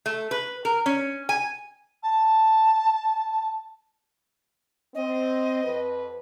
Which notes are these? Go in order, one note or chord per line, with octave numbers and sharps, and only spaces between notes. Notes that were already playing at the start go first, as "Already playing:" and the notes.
A3
B4
A#4
C#4
G#5
A5
C4 D#5
F2 B4